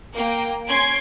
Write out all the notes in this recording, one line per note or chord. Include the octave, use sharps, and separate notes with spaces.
A#3 G5
C#4 C6 G#6 D7